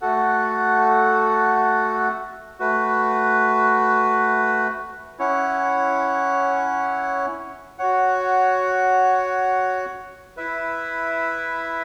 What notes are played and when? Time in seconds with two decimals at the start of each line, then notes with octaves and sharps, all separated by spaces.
0.01 A3 F#4 A4 F#5
2.59 A3 F#4 B4
5.19 C#4 E4 C#5 F#5
7.78 F#4 C#5 F#5
10.37 E4 B4 E5